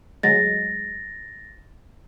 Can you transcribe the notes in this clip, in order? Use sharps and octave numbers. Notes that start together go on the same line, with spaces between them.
D2 F#3 G#3 A6 A#6